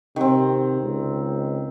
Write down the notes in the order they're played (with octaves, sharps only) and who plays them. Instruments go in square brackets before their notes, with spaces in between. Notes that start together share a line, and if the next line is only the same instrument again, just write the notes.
[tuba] C3 [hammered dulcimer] D#3 C4
[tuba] C#2